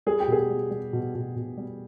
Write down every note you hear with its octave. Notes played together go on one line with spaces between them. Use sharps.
G3 G#4
G4
B2 G#4
G3
G3
B2
B2
B2
G3